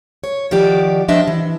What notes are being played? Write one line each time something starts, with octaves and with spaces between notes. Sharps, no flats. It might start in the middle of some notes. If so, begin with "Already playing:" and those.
C#5
D#3 F3 F#4 G4 D5
F3 B3 D4 D#5 E5
E3